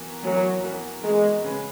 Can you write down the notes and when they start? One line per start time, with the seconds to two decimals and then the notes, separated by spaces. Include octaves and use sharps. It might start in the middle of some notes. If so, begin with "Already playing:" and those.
Already playing: E3 B3 F#4 A#4
0.22 E3 F#3 B3 F#4 A#4
0.63 E3 B3 F#4 A#4
1.03 E3 G#3 B3 F#4 A#4
1.44 C#3 G#3 C#4 G#4 B4